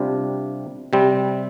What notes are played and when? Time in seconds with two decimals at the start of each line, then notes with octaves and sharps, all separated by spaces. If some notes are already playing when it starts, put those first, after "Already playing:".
Already playing: C3 G3 D4 F4
0.93 C3 G3 C4